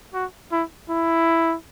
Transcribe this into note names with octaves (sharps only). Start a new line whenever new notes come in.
F#4
E4
E4